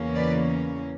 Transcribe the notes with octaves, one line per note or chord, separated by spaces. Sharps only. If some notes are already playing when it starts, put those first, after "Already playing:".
Already playing: E2 C#3 E3 A#3 C#4
B4 D5